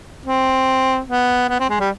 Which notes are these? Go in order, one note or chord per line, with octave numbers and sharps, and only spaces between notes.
C4
B3
B3
C4
G#3
G3